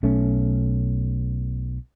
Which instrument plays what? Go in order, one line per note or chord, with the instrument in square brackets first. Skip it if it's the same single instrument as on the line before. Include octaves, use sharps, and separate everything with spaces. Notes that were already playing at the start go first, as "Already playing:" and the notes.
[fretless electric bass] B1 A3 C#4